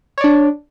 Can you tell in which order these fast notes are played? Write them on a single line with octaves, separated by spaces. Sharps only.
C#5 D5 D4